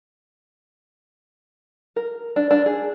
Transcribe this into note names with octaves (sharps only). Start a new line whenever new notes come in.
A#4
D4
D4
G#4